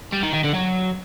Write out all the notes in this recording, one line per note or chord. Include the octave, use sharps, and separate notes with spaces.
G3
D#3
D#3
D3
F#3